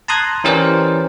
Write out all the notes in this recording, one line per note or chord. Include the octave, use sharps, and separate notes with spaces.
A5 A#5 C6 D#6 F#6 G#6
E3 C#4 G4 A#4 C5 D5